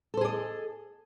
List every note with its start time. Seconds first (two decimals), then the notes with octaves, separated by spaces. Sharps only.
0.14 A4
0.17 C5
0.21 G#4
0.25 D5
0.28 D#5